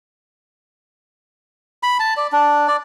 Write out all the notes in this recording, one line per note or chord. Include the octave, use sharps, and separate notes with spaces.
B5
A5
D5
D4
D5